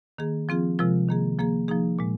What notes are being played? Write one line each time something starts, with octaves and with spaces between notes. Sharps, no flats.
D#3 A#3 G#4
F3 C4 F4 G#4
C3 F3 G#3 F4 A#4
D#3 A#3 G#4
F3 A#3 G#4
F3 A#3 D#4 G#4
A#2 G#3